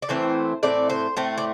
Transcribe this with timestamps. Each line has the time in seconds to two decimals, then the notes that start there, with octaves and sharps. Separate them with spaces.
0.02 D5
0.09 A2 E3 A3 C4 C5
0.63 A2 E3 A3 C4 D5
0.90 C5
1.17 A2 A3 C4
1.38 D5